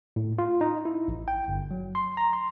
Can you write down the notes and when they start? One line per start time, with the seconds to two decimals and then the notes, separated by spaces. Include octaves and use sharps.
0.16 A2
0.39 F4
0.61 D#4
0.85 E4
1.08 A1
1.28 G5
1.48 G1
1.71 F#3
1.95 C6
2.17 A#5
2.33 C6